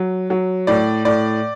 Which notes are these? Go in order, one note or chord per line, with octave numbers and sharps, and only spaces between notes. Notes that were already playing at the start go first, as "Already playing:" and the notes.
Already playing: F#3
F#3
A2 D5
A2 D5